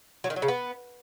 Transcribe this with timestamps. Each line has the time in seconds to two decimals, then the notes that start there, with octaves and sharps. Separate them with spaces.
0.24 F#3
0.30 D#3
0.36 F#3
0.42 C#3
0.48 B3